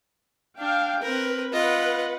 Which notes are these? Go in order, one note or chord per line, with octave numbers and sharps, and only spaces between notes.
D4 F5 G5
C4 A#4 B4
F4 B4 D#5 F#5